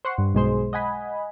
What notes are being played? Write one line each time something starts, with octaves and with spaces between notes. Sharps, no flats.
C5 F#5 C6 C#6
G2
B1 G#3 C5
D#5 F#5 G#5 B5